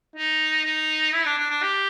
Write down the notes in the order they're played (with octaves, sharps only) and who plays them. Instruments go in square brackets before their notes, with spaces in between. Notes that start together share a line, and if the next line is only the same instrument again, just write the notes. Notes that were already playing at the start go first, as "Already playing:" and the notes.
[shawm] D#4
D#4
E4
D4
D4
D4
G4